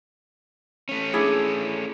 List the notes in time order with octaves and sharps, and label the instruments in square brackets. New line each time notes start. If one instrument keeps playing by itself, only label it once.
[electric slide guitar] A3 C#4
[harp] D4 E4 G#4